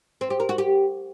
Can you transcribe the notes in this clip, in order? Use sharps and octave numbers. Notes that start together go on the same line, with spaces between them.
C4
G4
A#4
F#4
G4